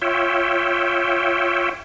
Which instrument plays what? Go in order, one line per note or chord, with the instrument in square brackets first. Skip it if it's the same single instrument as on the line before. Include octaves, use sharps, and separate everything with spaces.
[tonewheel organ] F4 C#5 E5 G5